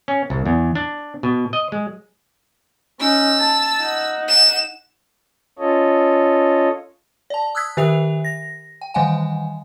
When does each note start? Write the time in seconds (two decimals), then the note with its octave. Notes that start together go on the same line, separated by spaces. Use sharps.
0.08 C#4
0.30 C2
0.45 E2
0.75 D4
1.23 B2
1.53 D#5
1.72 G#3
3.00 C#4 D#4 E6
3.39 A5
3.78 D#4 F#5
4.28 E7
5.59 C#4 F4 A4 C#5 D#5
7.30 D5 A5
7.55 D#6 E6 F#6 G#6 B6
7.77 D#3 G4 A#4 E5 F7
8.25 A#6
8.81 G5
8.94 D#3 E3 G3 F5 F#5 G#5